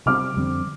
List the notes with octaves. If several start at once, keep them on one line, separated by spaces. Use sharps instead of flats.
C3 G3 C4 D6 F6
F2 D3 G3 C4